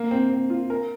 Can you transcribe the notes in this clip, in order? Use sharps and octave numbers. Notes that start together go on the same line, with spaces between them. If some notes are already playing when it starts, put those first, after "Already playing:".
Already playing: A#3
C4
C4
F4
A#4